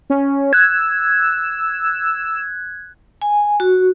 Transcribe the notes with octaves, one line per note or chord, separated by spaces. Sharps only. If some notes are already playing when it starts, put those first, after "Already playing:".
C#4
E6 F#6 G#6
G#5
F#4